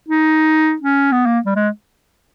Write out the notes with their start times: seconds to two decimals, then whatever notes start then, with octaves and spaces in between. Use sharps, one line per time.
0.08 D#4
0.82 C#4
1.12 B3
1.26 A#3
1.46 G3
1.55 G#3